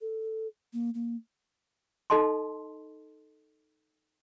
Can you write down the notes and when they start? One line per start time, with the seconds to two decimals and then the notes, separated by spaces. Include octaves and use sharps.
0.01 A4
0.73 A#3
0.94 A#3
2.10 D#4 A4 D#5 A5 C6